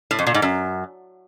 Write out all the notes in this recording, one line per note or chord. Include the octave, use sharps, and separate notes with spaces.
A2
F2
A#2
G#2
F#2